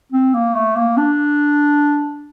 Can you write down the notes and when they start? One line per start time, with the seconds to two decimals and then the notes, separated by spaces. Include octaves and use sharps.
0.12 C4
0.34 A#3
0.55 A3
0.76 A#3
0.97 D4